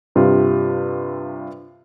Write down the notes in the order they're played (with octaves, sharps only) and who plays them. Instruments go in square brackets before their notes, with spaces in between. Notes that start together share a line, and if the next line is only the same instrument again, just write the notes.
[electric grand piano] G2 C3 F4 G4